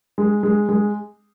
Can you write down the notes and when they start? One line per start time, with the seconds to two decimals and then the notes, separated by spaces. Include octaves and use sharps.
0.18 G#3
0.43 G#3
0.69 G#3